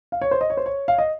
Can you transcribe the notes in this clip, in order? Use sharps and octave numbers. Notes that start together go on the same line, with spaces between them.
F5
C#5
C5
D#5
C#5
C5
C#5
F5
D#5